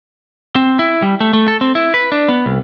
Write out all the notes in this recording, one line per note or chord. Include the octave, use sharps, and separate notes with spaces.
C4
E4
G3
A3
A3
A4
C4
E4
B4
D4
B3
C2